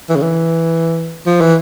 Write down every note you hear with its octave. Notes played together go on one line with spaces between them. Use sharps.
E3
C#3
E3
F3
E3